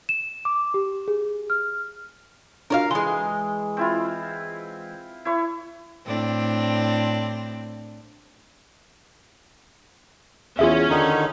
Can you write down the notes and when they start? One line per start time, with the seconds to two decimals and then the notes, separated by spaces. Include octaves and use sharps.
0.09 E7
0.45 D6
0.74 G4
1.08 G#4
1.50 F6
2.70 D4 F4 F#4 A#4 C#5 F5
2.91 E3 G#3 C6 G7
3.77 C4 E4 F4
5.25 E4 C#5
6.06 A2 C4 D4
10.59 E2 C#4 F4 G#4 E5
10.90 D3 D#3 D#4